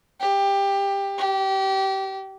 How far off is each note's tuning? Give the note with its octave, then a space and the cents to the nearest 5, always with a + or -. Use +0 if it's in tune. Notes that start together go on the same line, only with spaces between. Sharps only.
G4 +15
G4 -25